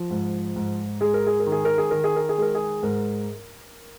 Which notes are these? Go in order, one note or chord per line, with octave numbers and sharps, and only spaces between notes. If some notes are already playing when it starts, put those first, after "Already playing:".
Already playing: F3
G#2
G#2
G#3 G#4
A#4
G#4
A#4
D#3
G#4
A#4
G#4
D#3 A#4
G#4
A#4
G#4
G#3 A#4
G#4
G#2 A#4